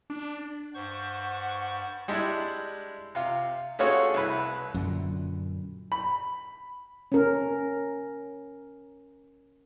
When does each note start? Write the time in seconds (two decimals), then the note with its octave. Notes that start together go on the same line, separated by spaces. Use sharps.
0.10 D4
0.74 G2 C5 F#5 C#6
2.08 G3 G#3 D4 E4
3.15 C3 F4
3.79 A3 C#4 F4 F#4 G#4 C#5
4.14 C2 E4 B4
4.74 F#2 A#2 D3
5.92 B5
7.12 C#4 A#4